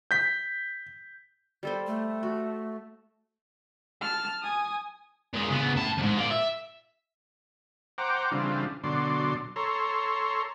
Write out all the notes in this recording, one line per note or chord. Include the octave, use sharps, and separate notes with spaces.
G6 B6
G3 A4 C5
A3
F#4
A5 F6
G#5 D#6
A#2 G#3
C#3 B3
A2 A5
F2 G#2
F4 D5
E5
C5 F#5 G5 A#5 D6
C#3 E3 G3 C4 D4 F4
B2 D3 F#3 D5 C6
A4 C#5 A#5 C6